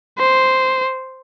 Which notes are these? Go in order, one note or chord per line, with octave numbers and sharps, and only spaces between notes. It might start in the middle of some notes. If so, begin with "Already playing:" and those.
C5